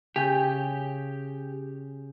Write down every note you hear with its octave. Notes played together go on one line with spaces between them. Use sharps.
C#3 G4 G#5 G6